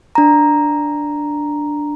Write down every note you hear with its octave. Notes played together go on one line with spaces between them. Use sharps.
D4 A#5